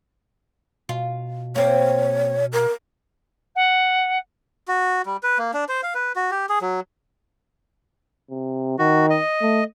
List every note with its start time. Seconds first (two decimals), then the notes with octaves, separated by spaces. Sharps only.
0.89 B2 F4
1.56 A#3 C4 C#5
2.53 A#4
3.55 F#5
4.68 F#4
5.06 G3
5.23 B4
5.38 A#3
5.54 D4
5.69 C5
5.83 F5
5.95 B4
6.16 F#4
6.31 G4
6.49 G#4
6.62 F#3
8.30 C3
8.79 D#3 F#4
9.10 D#5
9.41 A3